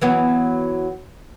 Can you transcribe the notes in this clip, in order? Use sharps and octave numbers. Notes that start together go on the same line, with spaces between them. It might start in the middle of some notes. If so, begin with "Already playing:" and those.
E3 F#3 B3